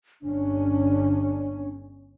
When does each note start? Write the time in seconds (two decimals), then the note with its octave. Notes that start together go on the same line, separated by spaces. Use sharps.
0.22 G1 C#4 D4